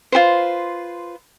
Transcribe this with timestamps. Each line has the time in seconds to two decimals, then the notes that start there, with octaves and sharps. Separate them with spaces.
0.12 F4 G4 B4 C5